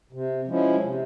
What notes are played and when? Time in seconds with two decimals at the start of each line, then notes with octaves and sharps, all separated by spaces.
0.13 C3
0.47 F3 G#3 C#4 E4
0.83 C3